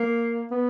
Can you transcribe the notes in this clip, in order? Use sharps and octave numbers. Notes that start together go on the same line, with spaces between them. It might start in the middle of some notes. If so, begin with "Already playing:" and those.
Already playing: A#3
B3